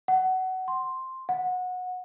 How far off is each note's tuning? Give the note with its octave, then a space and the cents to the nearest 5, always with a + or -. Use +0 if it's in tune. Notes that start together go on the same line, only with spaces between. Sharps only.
F#5 +20
C6 +5
F#5 -20